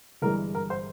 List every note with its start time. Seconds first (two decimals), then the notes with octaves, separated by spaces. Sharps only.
0.22 G1 G2 E3 G#3 A#4
0.55 A#4
0.70 C5